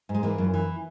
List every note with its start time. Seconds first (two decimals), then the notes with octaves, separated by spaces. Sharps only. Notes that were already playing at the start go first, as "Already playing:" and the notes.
0.09 G#2
0.14 G#3
0.23 E3 A#3
0.38 F#2
0.54 E3